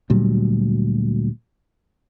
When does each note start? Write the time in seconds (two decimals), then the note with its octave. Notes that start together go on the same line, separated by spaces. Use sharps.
0.10 D2 A#2 F#3 G3